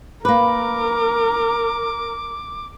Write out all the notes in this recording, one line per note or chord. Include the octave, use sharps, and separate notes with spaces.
A#3 A#4 B4 D6